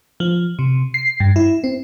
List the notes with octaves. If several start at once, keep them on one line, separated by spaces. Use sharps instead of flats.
F3
C3
C7
G2
E4
C4